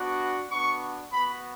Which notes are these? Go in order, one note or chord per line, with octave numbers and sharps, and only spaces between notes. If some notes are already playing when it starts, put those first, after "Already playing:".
Already playing: B3 D4 F#4
B3 D4 F#4 C#6
B3 F#4 B5